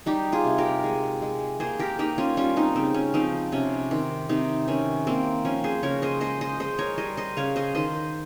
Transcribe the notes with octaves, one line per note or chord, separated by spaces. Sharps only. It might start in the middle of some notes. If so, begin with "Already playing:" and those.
G3 D#4 G4
F4 G#4
C3
G4 A#4
G#3
G#3
A#3 G#4 C5
G4 A#4
A#3 D#4 G4
C#4 F4
G3 C#4 F4
C4 D#4
C#3 C4
C#4
F3 C4 D#4
C3 C#4
D#3 C4
C3 C4 D#4
D#3 C#4
A#3 C4
F3 C#4
G#4 C5
C#3 A#4 C#5
C5 D#5
G#3 C5 D#5
C5 D#5
G#3 C5 D#5
A#4 C#5
G3 C5 D#5
C5 D#5
C#3 C#5 F5
C5 D#5
D#3 C5 D#5